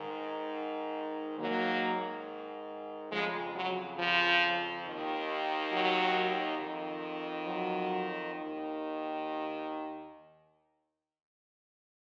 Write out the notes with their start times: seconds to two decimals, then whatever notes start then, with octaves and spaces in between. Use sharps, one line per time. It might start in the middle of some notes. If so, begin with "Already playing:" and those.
Already playing: G#2 D#3
1.39 G#2 D#3 F#3 A#3
3.12 F2 C#3 F3 G#3
3.56 F#3
3.99 F3
4.86 D#2 D#3
5.73 F#3
6.59 F2 D#3
7.46 F#3
8.33 D#2 D#3